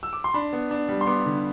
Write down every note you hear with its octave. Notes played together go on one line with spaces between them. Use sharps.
E6
D6
C6
D4 B5
B3
D4
G3
C6
B3 D6
D3